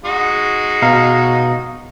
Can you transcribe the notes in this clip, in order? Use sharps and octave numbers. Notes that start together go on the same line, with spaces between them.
G#3 D#4 F#4
B2 F5 A#5